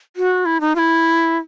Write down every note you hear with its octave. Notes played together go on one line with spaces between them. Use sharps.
F#4
E4
D#4
F4
E4